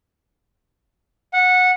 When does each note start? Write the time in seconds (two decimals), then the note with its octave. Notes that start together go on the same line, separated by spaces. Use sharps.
1.33 F#5